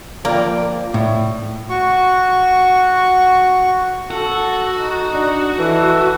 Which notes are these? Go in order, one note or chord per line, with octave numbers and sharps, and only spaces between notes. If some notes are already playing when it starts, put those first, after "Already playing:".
F3 A#3 D5 G5
A2
F#4 C#6
F#4 A4
D#4
D4
E3 A4